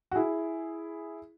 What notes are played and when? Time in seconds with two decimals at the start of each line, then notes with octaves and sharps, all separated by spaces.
0.11 F#4
0.15 E4 G#4